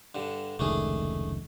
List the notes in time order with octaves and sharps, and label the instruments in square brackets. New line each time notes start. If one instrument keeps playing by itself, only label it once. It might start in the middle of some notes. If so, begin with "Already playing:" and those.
[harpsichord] G2 D3
[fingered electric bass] F1 C#2 D#3 [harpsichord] A3 D4 G#4